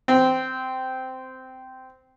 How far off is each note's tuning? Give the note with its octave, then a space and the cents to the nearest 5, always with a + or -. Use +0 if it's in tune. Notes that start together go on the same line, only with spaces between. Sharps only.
C4 -15